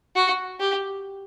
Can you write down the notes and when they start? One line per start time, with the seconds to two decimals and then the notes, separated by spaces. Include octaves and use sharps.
0.16 F#4
0.60 G4